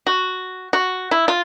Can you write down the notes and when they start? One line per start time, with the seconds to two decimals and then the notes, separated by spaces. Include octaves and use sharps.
0.06 F#4
0.73 F#4
1.11 E4
1.28 F4